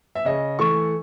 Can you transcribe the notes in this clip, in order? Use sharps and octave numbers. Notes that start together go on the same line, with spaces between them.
E5
C#3 D#5
E3 A3 C#6